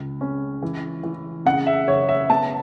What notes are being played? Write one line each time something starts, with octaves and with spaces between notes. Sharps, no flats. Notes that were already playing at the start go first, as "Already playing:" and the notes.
Already playing: C#2
C#4
E3
E3
C#3 F#5
E5
F#1 C#5
E5
B3 A5